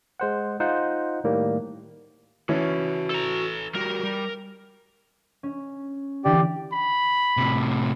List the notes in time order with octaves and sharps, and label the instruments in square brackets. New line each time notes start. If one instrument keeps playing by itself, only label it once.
[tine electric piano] G#3 C5 F#5
D#4 F4 C5 F#5
A2 D#3 G3 A#3
[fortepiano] E3 C#4 [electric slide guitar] F#4 A5
[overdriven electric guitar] A4 A#5
[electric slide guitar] G3 F#4 G4 [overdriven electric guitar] A#4
[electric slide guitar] G3
[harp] C#4
[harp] D3 E3 [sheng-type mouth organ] G4 D5
[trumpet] B5
[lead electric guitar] A2 C3